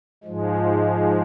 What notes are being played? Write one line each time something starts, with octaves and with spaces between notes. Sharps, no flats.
G#2 F3 G#3